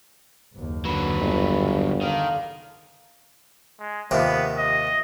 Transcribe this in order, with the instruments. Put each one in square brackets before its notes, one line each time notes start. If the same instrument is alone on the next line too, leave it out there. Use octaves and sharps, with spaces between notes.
[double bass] F#1 D#2
[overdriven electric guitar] D3 F#3 [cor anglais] B4
[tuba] G1
[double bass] D3 [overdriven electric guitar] D#3 [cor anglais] F5
[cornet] G#3
[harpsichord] D#2 C3 F3 [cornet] B3
[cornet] D#5